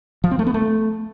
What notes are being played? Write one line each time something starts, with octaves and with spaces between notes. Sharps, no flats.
F3
C4
A3
B3
A3